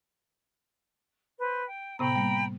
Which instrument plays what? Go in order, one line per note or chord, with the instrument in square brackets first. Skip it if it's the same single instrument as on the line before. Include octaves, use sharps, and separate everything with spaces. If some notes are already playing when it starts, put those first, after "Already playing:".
[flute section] B4 C5
G5
[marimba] A2 C3 B3 [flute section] G5 A#5 B5
[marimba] G3 A#3